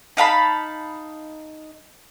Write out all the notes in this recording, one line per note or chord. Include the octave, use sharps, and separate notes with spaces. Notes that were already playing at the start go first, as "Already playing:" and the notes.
D#4 F5 A5 B5